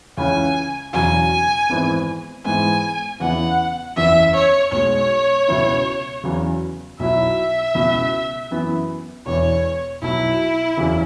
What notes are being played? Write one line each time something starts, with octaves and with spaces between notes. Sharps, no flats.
C#2 C#3 E3 C#4 G#5
E1 E2 C#3 F#3 G#5
G#1 G#2 E3 G#3 B3
G#2 E3 G#3 B3 G#5
E2 C#3 E3 B3 F#5
F#1 E2 E3 E5
C#5
B1 B2 G#3 C#5
C#2 B2 B3 E4
E2 C#3 F#3
B1 B2 F#3 E4 E5
C#2 B2 B3 E4
F#2 E3 B3 E4
E1 E2 E3 C#5
B1 B2 F#3 E4
F#1 E2 C#3 F#3